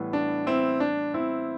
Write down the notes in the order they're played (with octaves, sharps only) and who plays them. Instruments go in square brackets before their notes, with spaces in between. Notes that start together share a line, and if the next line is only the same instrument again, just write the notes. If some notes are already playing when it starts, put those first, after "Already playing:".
Already playing: [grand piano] A2 E3 G3 B3
D4
C4 E4
D4
C4 E4